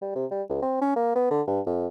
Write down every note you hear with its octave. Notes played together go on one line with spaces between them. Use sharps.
G3
C3
G3
C#2
C4
C#4
A#3
B3
D3
G2
F2